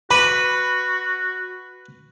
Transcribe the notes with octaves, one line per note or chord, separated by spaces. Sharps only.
F#4 B4 B5 D6